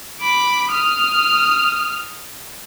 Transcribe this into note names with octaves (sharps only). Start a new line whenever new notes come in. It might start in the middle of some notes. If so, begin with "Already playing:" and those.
B5 D6
D#6 F6